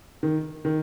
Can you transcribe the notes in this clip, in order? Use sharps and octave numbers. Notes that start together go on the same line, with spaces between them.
D#3
D#3